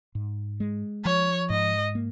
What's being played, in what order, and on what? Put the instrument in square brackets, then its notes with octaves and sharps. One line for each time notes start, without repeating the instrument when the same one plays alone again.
[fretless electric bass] G#2
G#3
[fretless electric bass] F3 [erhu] C#5
[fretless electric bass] G#2 [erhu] D#5
[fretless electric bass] A#3